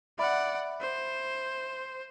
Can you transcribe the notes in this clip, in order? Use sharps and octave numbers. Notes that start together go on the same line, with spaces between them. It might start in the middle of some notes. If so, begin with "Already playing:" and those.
D5 E5 F#5 B5
C5